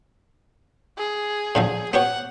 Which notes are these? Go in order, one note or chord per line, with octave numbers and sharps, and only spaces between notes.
G#4
A2 D3 F3
B3 G4 C#5 F#5